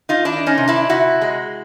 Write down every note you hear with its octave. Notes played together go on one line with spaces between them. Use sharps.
D#4 F4
D#3 D4 E4
C#4 D#4
C3
D4 E4
C3 E4 F#4
G#3